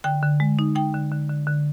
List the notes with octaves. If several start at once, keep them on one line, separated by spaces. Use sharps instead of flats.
D3 G5
D3
G#3
D#4
D#4 G5
D3
D3
D3
D3